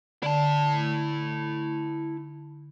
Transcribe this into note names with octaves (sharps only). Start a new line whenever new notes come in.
D3 E4 A5